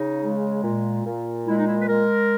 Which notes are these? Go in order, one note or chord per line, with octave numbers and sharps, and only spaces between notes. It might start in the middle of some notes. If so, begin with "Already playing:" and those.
Already playing: C#3 D#4
G#3
A#2
A#2
G#3 E4
D#4
E4
B4
G#3 A#4